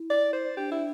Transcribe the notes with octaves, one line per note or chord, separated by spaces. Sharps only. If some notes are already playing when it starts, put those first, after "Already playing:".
Already playing: E4
D5
C5
D4 G4
E4